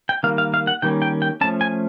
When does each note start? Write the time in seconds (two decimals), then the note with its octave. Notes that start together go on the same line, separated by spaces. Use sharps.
0.09 G5
0.23 D#3 G3 A#3 F5
0.38 F5
0.54 F5
0.67 F#5
0.82 D#3 G3 A#3 C#4 G5
1.02 G5
1.22 G5
1.41 F3 A3 C#4 A5
1.61 G#5